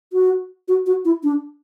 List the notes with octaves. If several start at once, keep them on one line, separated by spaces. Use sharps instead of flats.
F#4
F#4
F#4
E4
D4